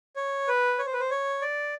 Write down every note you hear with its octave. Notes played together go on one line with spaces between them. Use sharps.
C#5
B4
C#5
C5
B4
C5
C#5
D5